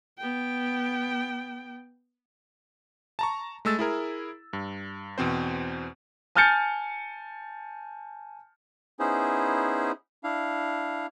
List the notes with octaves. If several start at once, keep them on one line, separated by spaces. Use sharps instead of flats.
B3 G5
A5 A#5 C#6
G#3 A3 E6 A6
E4 G#4 A#4
G2
E2 B2 C4 C5
G#5 A5 F6 G6 A6 C#7
B3 C#4 D#4 E4 G#4 C5
D4 E4 F5